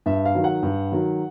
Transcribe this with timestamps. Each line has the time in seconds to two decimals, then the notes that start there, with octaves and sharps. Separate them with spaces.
0.06 G2 E5
0.25 F5
0.34 D#3 F#3
0.44 F#5
0.63 G2
0.92 D#3 F#3